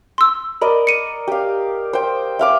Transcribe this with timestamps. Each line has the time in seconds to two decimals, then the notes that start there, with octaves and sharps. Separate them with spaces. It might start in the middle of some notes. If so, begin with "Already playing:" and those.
0.18 C6 E6
0.62 A#4 D5 D#5 B5
0.87 C#7 D#7
1.28 G4 F5
1.93 C5 G5
2.39 E5 F5 D6